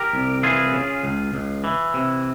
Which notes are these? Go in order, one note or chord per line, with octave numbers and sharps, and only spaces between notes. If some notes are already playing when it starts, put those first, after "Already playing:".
Already playing: G4 A#4
C2
E3 F4 G#4
C#3
C#2
C#2
E3
C3